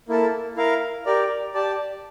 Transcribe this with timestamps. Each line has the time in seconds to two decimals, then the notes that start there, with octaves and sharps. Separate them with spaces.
0.09 A#3 E4 A4
0.56 E4 A#4 F5
1.06 G4 A#4 D5
1.54 G4 D5 A5